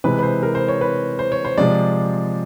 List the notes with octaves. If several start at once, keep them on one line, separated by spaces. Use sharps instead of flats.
C3 E3 G#3 B4
B4
C5
A#4
C5
C#5
B4
C5
C#5
C5
C3 F3 G#3 D5